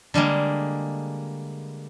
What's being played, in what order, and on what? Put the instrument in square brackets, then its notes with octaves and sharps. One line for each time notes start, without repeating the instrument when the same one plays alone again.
[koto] D3 G3 G#3 A#3